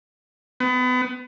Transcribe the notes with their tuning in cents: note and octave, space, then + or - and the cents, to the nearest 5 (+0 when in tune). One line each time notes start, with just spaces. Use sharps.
B3 +30